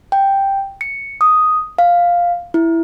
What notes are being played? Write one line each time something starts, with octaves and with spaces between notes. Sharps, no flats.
G5
C#7
D#6
F5
E4